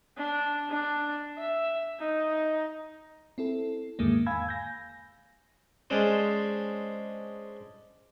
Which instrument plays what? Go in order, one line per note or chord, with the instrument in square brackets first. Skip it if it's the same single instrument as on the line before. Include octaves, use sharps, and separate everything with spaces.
[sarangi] D4
D4
E5
D#4
[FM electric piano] C4 E4 A4
E2 G#2 D3 D#3 G#3 A#3
F5 G#5 B5 E6 G#6
G#5 G6 A#6
[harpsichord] G#3 C#4 D4 C5